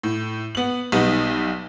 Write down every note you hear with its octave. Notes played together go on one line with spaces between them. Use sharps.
A2
B3 F#7
B1 G3 B3 D#4